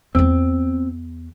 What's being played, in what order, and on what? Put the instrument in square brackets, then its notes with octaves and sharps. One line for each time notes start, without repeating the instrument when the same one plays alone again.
[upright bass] E2 B3 [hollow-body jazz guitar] C4